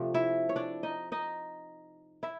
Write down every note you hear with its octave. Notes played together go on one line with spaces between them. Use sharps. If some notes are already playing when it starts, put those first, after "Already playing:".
Already playing: C3 F3 A3 D4
E4 E5
C#5
D4 D5
D#4 D#5
D#4 D#5
E4 E5